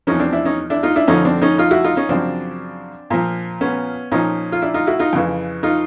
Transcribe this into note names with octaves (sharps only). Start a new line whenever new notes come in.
E2 C3 F3 C#4 D#4
C4 D4
D4 E4
C#4 D#4
D4 E4
D#4 F4
D4 E4
F2 D3 F3 C#4 D#4
C4 D4
C#4 D#4
D#4 F4
E4 F#4
D#4 F4
C#4 D#4
F#2 C#3 F3 C4 D4
A#2 F3
B3 C#4
A#2 F3 C#4 D#4
F4
D4 E4
D#4 F4
E4 F#4
D#4 F4
F2 C#3 E3
D#4 F4